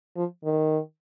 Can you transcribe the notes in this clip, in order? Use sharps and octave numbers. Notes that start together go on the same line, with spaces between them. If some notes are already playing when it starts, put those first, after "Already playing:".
F3
D#3